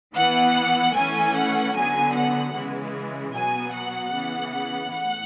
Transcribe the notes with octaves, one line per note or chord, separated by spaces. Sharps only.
E3 B3 F#5
E3 A3 C#4 G#5
F#5
D3 F#3 B3 G#5
F#5
C#3 E3 G#3
B2 F#3 B3 G#5
F#5
C#3 E3 B3
A2 F#5